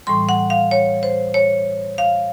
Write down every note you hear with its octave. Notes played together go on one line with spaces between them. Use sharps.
A2 E3 G3 C6
F#5
F5
C#5
C5
C#5
F5